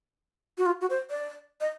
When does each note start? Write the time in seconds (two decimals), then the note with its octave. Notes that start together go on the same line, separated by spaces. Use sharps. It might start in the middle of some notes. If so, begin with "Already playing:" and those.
0.58 F#4
0.66 F4
0.81 F#4
0.90 C5
1.10 D5
1.61 D#5